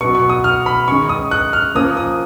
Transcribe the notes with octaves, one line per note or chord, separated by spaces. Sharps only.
B2 F#3 B3 C#6
C#6
D#6
F6
B5
D#3 G#3 C#4 C#6
D#6
F#6
F6
F3 A#3 C#4 D#6
D#6